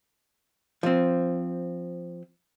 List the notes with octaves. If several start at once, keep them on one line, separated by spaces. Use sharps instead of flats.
F3 C4